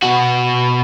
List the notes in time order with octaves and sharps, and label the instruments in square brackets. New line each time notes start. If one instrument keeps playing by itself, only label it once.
[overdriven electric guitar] B2 F#4